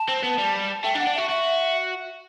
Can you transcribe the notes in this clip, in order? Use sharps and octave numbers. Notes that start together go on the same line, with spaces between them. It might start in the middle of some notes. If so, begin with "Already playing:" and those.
Already playing: A5
C4
B3
G3
A3 G5
D4
F#5
D4
F#4 E5
F#4 E5